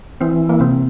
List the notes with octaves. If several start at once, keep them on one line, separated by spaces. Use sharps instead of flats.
E3 C4
A#3
C3 C4